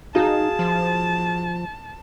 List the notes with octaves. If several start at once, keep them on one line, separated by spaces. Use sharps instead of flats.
D#4 F#4 G#4 F5 A5
F3